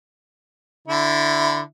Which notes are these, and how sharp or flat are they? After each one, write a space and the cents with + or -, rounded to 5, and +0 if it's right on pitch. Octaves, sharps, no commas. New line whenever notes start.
D3 +0 E4 +0